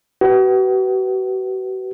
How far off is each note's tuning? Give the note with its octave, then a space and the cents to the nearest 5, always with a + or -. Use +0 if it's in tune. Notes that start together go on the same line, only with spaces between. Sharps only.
F#4 +40 B4 +0